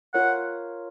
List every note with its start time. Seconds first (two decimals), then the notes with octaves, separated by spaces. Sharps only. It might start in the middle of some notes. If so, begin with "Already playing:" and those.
0.14 F4 A#4 C#5 F#5